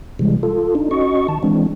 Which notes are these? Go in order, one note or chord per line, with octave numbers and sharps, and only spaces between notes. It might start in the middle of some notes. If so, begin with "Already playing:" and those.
C3 E3 G3 G#3
F4 A4
D4 D#4
C#4 F#4 D#5 C#6
D#3 A5
E3 G#3 C4 D4